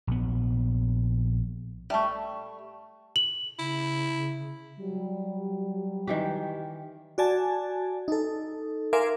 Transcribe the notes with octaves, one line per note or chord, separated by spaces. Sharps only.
A#1 B3
G3 A3 E5 A5 C#6
F#7
C#3 E4
F#3 G3
D#3 E3 G4
F#4 D5 G#5 A5
D#4 A4
A#4 E5 F5 G#5 C6 D6